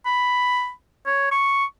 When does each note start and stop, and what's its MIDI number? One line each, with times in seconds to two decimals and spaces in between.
0.06 0.71 83
1.06 1.30 73
1.32 1.65 85